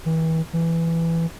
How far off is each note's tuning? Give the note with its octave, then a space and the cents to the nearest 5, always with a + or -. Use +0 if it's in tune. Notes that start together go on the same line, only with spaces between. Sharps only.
E3 -35
E3 +10